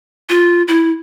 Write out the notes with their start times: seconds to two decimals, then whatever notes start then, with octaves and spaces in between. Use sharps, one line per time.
0.30 F4
0.68 E4